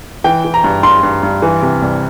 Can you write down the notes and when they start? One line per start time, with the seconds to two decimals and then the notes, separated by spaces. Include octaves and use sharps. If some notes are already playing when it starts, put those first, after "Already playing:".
0.24 E3 G5
0.44 E3
0.54 A#5
0.64 G2
0.83 G2 C6
1.03 G2
1.23 G2
1.42 E3
1.62 C3
1.82 C2